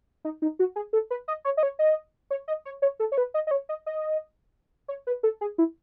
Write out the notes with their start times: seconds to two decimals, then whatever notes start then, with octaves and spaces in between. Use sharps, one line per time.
0.25 D#4
0.42 D#4
0.59 F#4
0.76 G#4
0.93 A4
1.11 B4
1.28 D#5
1.45 C#5
1.57 D#5
1.63 C#5
1.79 D#5
2.31 C#5
2.48 D#5
2.65 C#5
2.82 C#5
3.00 A4
3.12 C#5
3.18 B4
3.34 D#5
3.47 D#5
3.51 C#5
3.69 D#5
3.86 D#5
4.88 C#5
5.07 B4
5.23 A4
5.41 G#4
5.58 E4